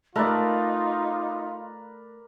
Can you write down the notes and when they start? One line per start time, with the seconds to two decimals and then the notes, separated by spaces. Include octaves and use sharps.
0.16 A3 D#4 F4 A#4 B4 D5